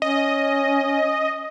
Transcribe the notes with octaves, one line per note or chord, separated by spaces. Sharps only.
C#4 D#5